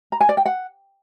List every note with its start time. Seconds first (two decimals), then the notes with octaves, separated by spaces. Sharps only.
0.12 A#5
0.21 G#5
0.29 D5
0.37 G5
0.45 F#5